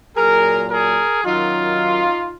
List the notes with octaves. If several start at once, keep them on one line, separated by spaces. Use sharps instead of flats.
A#2 F#3 G#4 A#4
G#4 A#4
F#2 D#3 F#3 D#4 F4